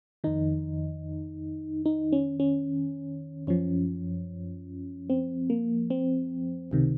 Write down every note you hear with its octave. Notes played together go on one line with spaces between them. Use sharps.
F2 D#3 D#4
D#4
C#4
C#4
F#2 F3 C#4
C4
A#3
C4
C#2 C3 D#3